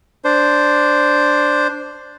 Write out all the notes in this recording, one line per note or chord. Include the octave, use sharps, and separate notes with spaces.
D4 C5